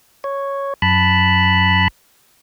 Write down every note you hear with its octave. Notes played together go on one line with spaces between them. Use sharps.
C#5
F#2 A5 B5 F#6